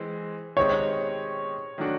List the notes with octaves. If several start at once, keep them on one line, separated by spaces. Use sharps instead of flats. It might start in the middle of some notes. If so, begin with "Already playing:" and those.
Already playing: E3 G#3 C4
D#3 G#3 C4 D#4 G4 C#5
D#3 F#3 A3 D4 F#4